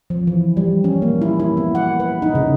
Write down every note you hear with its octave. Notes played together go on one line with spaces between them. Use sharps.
F3
E3
G3
C#4
A#3
E4
E4
B3
F#5
B4
D#4
C#3